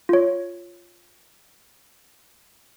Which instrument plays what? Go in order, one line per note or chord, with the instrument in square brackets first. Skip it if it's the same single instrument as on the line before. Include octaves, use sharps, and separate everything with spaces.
[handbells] F4 C#5